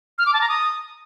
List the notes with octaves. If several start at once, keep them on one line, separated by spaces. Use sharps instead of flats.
F6
D6
A5
A#5
D#6